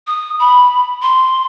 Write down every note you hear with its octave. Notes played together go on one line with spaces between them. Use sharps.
D#6
B5
C6